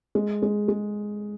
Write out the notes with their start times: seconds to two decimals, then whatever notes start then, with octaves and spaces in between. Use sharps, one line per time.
0.15 G#3
0.43 G#3
0.68 G#3